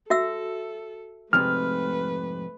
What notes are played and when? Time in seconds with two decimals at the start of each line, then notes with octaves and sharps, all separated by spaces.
0.10 F#4 A4 E5 E6
1.33 F2 G#2 C3 A3 B4 F6